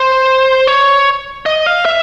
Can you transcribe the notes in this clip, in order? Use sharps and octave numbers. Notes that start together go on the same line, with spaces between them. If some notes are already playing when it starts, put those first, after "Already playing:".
Already playing: C5
C#5
D#5
F5
E5